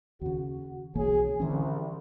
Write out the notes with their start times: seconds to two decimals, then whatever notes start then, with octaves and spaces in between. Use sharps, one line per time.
0.21 D#2 C#3 F#4
0.95 B1 E3 A#3 C#4 G#4
1.40 C2 D3 E3 C#4